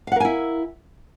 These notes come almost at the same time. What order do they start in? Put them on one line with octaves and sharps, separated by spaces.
F5 F#5 A#4 G#5 E4